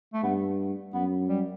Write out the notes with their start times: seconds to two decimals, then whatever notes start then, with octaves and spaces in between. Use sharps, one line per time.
0.14 A3
0.23 G2 B3
0.94 F#2 B3
1.29 G3